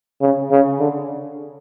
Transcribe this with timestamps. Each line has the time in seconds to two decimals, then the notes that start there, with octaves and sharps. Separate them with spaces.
0.21 C#3
0.51 C#3
0.80 D3